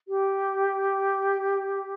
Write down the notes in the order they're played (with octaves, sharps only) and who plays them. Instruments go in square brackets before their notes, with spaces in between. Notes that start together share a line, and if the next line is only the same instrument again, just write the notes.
[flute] G4